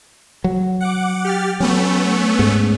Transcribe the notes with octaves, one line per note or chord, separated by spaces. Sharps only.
F#3
F#5 D6
G4 F6 A6
F#3 A3 B3 C#4
G#2